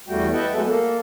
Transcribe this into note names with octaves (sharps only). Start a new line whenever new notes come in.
E2 G3 A3 F#4 G5
B4 D#5 E5 F#5 G5 A5
F#3 G#3 A3 B3 A4 B4
A#3 A4